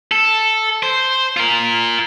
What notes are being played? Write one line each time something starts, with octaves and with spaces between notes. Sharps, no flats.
A4
C5
F4 A#4